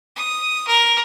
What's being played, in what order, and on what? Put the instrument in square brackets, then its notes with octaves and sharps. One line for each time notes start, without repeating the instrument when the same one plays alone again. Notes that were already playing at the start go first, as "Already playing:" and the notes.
[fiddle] D#6
A#4